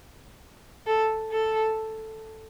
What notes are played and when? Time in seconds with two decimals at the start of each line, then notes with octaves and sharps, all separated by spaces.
0.86 A4
1.32 A4